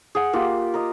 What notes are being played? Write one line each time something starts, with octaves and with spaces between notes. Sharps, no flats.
G#4 F#5
A#3 F4 G4
A#4 D#5